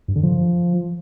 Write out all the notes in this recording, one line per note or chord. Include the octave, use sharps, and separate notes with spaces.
G2
D3
F3